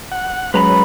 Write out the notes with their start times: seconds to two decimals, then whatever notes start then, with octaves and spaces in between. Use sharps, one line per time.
0.12 F#5
0.54 F#3 G#3 C#4 B4 A#5 B5